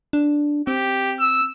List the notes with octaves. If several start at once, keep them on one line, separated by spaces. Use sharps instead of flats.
D4
C4 G4
E6